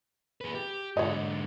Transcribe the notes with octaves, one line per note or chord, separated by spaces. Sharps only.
G#4 B4
G4
G#2 D3 C#5 D#5